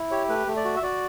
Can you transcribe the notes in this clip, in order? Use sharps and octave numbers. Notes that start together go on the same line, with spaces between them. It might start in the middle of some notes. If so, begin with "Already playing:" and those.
Already playing: E4
G4 C#5
A3 B4
A3
D5
F#4
E5
F#4 D5